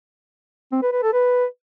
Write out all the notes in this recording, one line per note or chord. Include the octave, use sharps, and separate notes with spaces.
C4
B4
B4
A4
B4